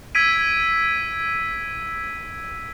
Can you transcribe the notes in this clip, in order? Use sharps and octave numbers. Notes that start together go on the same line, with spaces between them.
E6 G#6 B6 D7 D#7